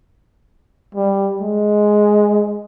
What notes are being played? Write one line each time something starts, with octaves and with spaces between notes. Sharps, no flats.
G3
G#3